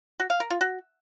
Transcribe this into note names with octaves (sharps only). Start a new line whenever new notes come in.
F#4
F5
A#4
F4
F#4